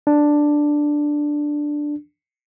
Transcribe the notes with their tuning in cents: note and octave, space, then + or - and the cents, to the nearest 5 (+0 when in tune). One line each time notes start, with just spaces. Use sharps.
D4 +5